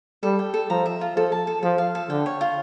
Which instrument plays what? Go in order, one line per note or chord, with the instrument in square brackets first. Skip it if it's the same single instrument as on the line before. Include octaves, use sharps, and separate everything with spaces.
[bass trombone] G3 [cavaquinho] A4
[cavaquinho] G5
A4
[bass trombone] F3 [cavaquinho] A#5
[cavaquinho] E5
F4
[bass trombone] F3 [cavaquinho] A4
[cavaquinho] A5
A4
[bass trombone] F3 [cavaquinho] A4
[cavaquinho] F5
A4
[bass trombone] D3 [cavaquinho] G5
[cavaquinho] C#5
F4